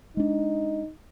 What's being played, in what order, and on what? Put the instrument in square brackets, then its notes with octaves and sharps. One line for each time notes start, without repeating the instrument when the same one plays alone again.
[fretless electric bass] G#3 D4 [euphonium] D#4